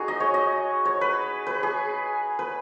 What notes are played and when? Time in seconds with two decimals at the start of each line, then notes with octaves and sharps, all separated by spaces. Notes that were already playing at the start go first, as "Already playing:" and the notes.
Already playing: D#4 F#4 G#4
0.08 D#5
0.20 C#5
0.34 D#5
0.85 C#5
1.01 B4
1.47 B4
1.63 G#4
2.39 B4